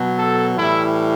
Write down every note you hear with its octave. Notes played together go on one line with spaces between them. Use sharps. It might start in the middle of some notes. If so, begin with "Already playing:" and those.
Already playing: B2 F#3
A4
A2 E3 G3 E4